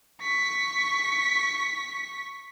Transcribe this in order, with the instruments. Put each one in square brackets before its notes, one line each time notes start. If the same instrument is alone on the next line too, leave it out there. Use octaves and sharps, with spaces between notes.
[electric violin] C#6 B6